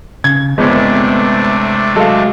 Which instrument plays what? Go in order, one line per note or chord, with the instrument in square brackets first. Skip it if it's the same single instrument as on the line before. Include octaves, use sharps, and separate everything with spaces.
[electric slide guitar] C#3 [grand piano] G#6
[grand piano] G1 [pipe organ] C3 A3 D4 [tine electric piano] G#3 [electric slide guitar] B3 C4 B4
[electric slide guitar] F#3 [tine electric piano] G#3 F5 [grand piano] A4